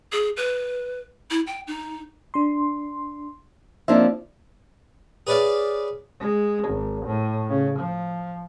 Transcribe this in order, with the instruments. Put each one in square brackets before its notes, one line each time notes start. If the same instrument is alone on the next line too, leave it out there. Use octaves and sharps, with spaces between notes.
[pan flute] G#4
B4
E4
G5
D#4
[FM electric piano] D4 C6
[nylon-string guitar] F3 A#3 D4 [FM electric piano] C4 D#4 E5
[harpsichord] G#4 B4 C#5 D5 E5 F5
[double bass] G#3
G#1
A2
C#3
F3